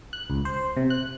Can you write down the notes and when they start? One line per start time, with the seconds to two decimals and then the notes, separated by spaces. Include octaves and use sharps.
0.13 F#6
0.30 C#2
0.45 C5
0.77 C3
0.90 F#6